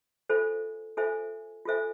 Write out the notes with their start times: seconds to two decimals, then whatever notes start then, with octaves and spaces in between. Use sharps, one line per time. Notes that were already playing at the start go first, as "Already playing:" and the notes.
0.30 F4 A4 C5 E5 G#5
0.97 F4 A4 C5 E5 G#5
1.65 F4 A4 C5 E5 G#5